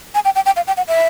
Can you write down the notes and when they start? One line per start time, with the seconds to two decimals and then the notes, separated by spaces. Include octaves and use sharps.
0.15 G#5
0.25 G5
0.35 G5
0.46 G5
0.56 F5
0.67 G5
0.77 F#5
0.88 E5